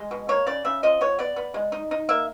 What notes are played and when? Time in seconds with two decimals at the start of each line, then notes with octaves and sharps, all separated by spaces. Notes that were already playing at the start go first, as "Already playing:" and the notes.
Already playing: G#3
0.11 B2
0.29 A#3 C#5
0.47 C#3 D5
0.65 C#3 E5
0.83 F3 D#5
1.01 B3 C#5
1.19 B3 D5
1.36 B3
1.54 G#3
1.72 D#4
1.91 D#4
2.09 A#3 E5